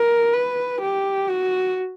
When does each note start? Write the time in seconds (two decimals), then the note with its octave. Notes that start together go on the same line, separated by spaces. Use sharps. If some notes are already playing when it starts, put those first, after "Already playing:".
Already playing: A#4
0.33 B4
0.82 G4
1.30 F#4